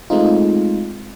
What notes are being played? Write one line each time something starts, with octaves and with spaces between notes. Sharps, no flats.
G#3 A3 C4 D#4 F4